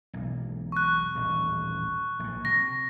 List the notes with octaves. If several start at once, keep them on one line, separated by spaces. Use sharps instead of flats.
E1 B1
C#6 F#6
D#1 A1 D#2
A#1 A2
C3 A#6